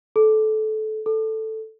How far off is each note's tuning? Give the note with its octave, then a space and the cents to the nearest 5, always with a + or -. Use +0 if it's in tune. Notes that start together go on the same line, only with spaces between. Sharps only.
A4 -20
A4 +0